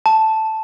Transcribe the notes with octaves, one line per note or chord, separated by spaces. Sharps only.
A5